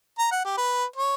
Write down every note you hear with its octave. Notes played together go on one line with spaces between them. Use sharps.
A#5
F#5
G4
B4
C#5